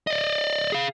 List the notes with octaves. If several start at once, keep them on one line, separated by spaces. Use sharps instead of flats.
D5 D#5
G#4 F5